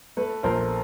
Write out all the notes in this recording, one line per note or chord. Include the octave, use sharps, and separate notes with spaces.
A3 A4 B4
A#1 A#4 C5